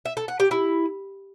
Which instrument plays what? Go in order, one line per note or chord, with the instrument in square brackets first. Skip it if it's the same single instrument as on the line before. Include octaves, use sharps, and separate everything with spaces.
[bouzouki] E5
A4
F#5
G4
E4